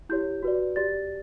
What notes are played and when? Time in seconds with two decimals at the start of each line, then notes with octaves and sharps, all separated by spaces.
0.09 E4 G4 C#5 G6
0.43 F#4 B4 D5
0.76 G4 D5 A6